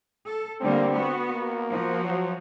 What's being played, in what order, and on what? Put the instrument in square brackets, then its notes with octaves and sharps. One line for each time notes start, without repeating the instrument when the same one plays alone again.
[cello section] A4
[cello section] D3 G3 A#3 [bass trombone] C4
[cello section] B3 F#4
[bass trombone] A#3
[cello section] F3 F#4
[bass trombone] F#3